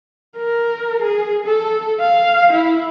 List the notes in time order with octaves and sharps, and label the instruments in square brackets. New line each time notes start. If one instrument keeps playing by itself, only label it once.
[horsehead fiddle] A#4
G#4
A4
F5
E4